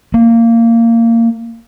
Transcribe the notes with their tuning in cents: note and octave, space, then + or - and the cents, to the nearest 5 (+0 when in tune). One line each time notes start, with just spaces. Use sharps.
A#3 -20